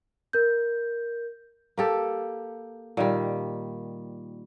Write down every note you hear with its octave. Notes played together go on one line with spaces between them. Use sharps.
A#4 G6
A#3 G4 A4
A#2 D#3 G3